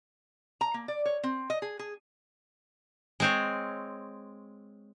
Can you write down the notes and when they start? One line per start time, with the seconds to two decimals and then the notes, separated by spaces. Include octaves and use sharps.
0.61 A#5
0.74 A#3
0.88 D5
1.06 C#5
1.23 C4
1.50 D#5
1.62 G#4
1.79 G#4
3.20 G#3 C4 C#5